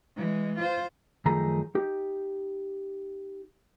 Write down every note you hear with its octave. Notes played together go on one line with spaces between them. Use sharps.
E3 G#3
F4 C5
F#2 D#3 F3 A3 G#4 A#5
D#4 G4